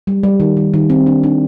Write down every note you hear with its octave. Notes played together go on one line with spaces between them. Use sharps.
G3
G3
D#3
D#3
D#3
C4
D4
D4